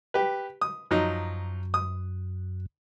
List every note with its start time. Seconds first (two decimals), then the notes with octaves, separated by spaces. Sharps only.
0.14 G4 B4
0.61 D#6
0.91 F#2 F3 F#3 D#4
1.74 D#6